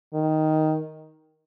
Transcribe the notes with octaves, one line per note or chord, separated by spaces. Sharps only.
D#3